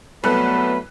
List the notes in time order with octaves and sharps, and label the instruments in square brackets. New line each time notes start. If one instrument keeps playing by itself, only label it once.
[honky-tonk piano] C2 A4 F#6 [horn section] F#3 A3 B3 [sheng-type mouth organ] B4